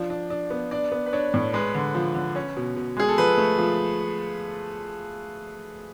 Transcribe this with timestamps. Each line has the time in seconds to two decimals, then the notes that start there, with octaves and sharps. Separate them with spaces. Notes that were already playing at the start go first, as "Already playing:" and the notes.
Already playing: F3 D4
0.10 D4
0.30 D4
0.50 B3
0.71 D4 D5
0.92 B3
1.06 B4
1.13 D4 C#5
1.34 A2
1.53 G#3 B4
1.74 D3
1.95 F3
2.15 D3
2.36 C#4
2.56 B2
2.76 B2
2.97 G#3 G#4
3.08 A4
3.17 F3 B4
3.38 A3
3.58 F3